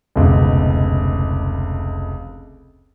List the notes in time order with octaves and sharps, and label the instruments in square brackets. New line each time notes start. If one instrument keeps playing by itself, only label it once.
[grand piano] F1 C#2 B2